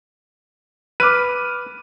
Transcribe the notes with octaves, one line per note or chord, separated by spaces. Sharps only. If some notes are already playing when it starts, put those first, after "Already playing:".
B4 D6 F6 D#7